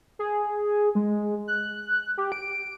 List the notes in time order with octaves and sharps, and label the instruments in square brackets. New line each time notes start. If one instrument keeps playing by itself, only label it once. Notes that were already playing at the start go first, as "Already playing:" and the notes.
[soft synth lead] G#4
G#3
F#6
G4
D7